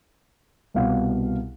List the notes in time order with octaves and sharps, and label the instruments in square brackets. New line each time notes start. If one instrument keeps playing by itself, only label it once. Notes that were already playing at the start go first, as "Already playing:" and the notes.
[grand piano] C2 B2 F5 F#5